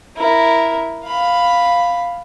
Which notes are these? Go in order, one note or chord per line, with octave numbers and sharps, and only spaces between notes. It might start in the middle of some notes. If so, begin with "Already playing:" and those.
E4 A#4
F5 B5